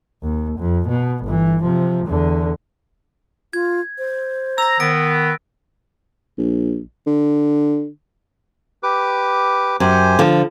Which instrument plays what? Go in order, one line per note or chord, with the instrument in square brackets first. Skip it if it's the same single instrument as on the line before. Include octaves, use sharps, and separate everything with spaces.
[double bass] D#2
F2
B2
G1 E3
C3 F3
E2 D3
[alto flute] F4 [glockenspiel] G#6
[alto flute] C5
[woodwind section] A#5 [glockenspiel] E6 A#6
[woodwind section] D#3 B3 [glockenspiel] A#6 D7
[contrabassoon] A#1
D3
[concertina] G4 B4 D6
[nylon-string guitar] F#2 [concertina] G4 C5 G#5
[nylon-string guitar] D3 F3